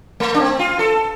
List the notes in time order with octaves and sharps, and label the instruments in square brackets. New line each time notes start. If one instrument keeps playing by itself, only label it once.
[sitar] A3
D4
C4
F4
A4